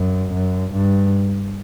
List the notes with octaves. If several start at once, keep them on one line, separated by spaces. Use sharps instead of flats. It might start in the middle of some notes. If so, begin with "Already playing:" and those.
Already playing: F#2
F#2
G2